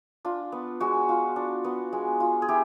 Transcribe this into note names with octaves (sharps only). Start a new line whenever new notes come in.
D4 F4
B3
G#3 F#4
F4
D4
B3
G#3
F4
G#4
E4 G4